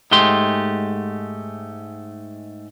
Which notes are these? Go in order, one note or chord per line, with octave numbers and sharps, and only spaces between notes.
G#2 G#3 A3 G4 C6